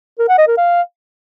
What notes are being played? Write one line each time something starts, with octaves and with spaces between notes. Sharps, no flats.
A#4
F#5
D#5
A#4
F5